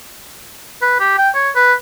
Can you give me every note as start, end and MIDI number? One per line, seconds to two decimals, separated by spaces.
0.82 0.98 71
1.00 1.15 67
1.18 1.30 79
1.35 1.50 73
1.55 1.74 71